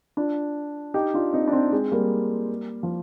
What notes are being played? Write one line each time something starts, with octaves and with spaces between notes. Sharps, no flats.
D4 F4
D#4 G4
D4 F4
C4 D#4
D4
C4 D#4
G#3 C4
G3 A#3
F3